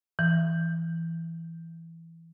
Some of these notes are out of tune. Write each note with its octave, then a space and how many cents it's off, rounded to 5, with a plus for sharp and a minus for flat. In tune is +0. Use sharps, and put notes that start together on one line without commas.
E3 +5